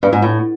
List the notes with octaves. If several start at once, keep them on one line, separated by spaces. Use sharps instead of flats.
G2
G#2
A2